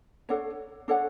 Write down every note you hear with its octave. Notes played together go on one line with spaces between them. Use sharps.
D4 A4 C#5 F#5
D4 A4 C#5 F#5